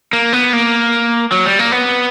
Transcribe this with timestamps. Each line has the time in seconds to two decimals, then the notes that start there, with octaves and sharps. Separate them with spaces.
0.13 A#3
0.33 B3
0.53 A#3
1.32 F#3
1.46 G3
1.59 A#3
1.72 B3